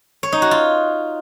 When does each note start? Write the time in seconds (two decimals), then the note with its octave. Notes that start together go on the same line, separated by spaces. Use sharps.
0.23 C#5
0.32 D#4
0.42 F#4
0.51 F4